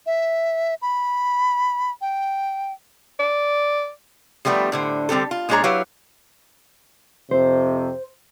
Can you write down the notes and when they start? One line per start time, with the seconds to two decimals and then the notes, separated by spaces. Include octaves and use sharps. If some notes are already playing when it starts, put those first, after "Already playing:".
0.06 E5
0.82 B5
2.01 G5
3.19 D5
4.45 F3 G3 A3 B3 D4
4.72 A2 D3 C5
5.09 D3 G3 C4 G4 A4
5.31 F4
5.49 A#2 G#3 D4 G#4 C#5 A#5
5.64 F#3 E4 G4 B4 C#5 F5
7.31 F2 C3 C5